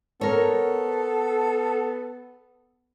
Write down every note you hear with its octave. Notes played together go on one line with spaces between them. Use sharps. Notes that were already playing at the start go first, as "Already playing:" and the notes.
B3 A4 A#4 C#5